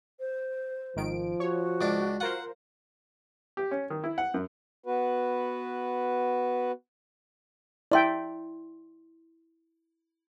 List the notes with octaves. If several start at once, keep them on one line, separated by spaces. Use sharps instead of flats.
C5
G#1 D#3 F3 D7
F#4 C#5
C#2 D4 D6
F4 A#4 C5 F#5
G4
C#4
D#3
E4
F#5
F#2
B3 F#4 B4
E4 D5 E5 G5 C6